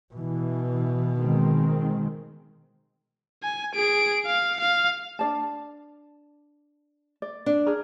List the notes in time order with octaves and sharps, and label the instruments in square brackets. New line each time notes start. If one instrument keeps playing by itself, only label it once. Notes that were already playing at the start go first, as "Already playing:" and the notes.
[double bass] B2 [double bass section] E3
[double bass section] D#3 G#3 C4
[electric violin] G#5
G#4 D7
F5
F5
[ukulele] D4 D5 A5
D5
[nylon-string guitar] D4
[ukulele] G#4 A#4